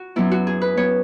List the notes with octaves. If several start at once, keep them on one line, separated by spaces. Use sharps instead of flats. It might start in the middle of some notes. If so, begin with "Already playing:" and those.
Already playing: F#4
F#2 F#3 B3 E4
F#4
G#4
B4
F#3 B3 C#5